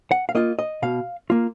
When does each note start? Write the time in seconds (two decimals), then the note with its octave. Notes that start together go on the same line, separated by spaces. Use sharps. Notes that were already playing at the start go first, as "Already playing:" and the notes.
0.11 F#5
0.29 F5
0.35 A#3 F4 D#5
0.59 D#5
0.82 B2 F5
1.30 A#3 F4